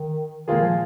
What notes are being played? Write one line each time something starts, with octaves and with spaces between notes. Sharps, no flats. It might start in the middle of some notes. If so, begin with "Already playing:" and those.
Already playing: D#3
A#2 D#3 G#3 F4 G#4
F3